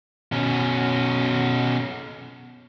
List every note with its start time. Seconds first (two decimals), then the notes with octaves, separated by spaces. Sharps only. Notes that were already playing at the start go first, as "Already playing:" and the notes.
0.32 B2 C#4